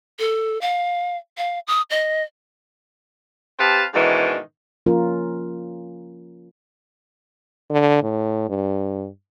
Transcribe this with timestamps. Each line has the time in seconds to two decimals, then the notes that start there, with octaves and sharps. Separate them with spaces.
0.19 A4
0.61 F5
1.38 F5
1.67 D#6
1.90 D#5
3.59 C4 G4 B4 F5 A5
3.94 G#2 B2 D#3 E3 C#4 D4
4.86 F3 A#3 C#4 F4 A#4
7.70 D3
8.02 A2
8.49 G2